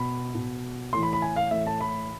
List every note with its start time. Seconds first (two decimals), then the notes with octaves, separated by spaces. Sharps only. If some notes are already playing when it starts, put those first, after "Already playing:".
Already playing: B2 B5
0.35 B2
0.93 A2 E3 C6
1.03 B5
1.13 B5
1.22 G#5
1.36 F5
1.51 A2 E3 E5
1.67 A5
1.81 B5